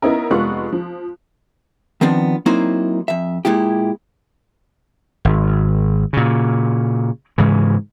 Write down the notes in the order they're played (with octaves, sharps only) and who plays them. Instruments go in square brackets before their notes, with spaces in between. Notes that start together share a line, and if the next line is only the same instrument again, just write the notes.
[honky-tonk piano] B3 C#4 D#4 E4 A#4
F1 G#3 B3 F4 C#6 F#6
F3
[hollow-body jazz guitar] D#3 F3 B3 C4 D4
F#3 A#3 C4 D#4 E4 C5
F2 E5
A#2 G#3 E4 G4
[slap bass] G#1
A#2 C#3
G#2 C#3 E3